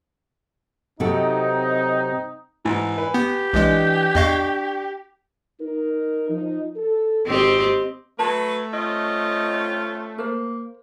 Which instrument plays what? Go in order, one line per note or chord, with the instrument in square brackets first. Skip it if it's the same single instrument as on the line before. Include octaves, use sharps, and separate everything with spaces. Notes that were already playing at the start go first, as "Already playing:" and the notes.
[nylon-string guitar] C3 F#3 A4 [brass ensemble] C4 D#4
[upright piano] G#2 [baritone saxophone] E3
[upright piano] B4
[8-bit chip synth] B3 [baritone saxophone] G4
[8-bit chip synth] B1 G#3 [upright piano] E3 D4 D#5
[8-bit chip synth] E2 D#5 F5 [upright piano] D4 C#6
[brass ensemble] D#4 A#4
F3 D#4
A4
[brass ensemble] G#1 [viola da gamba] C4 G4 D#5
[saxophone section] F#3 B4 [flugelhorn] A3 [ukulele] A5
[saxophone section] C4 C#4 F4 [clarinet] D#5
[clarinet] A#3 [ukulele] A#4 C5